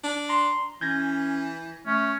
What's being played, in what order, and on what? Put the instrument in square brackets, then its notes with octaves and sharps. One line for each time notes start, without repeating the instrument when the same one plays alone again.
[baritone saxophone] D4
[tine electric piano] A#5 [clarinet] C6
[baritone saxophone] E3 [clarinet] C#4 [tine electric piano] G6 G#6 A#6
[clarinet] A3 [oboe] C#4